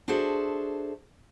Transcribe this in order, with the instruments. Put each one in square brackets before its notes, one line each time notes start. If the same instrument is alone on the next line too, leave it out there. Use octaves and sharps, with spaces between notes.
[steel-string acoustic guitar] D4 F#4 G#4 A4 C5 E5